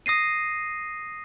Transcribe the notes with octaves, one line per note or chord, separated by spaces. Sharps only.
D#6 A#6 C7 D#7